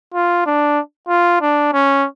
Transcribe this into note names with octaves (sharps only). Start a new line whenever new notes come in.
F4
D4
F4
D4
C#4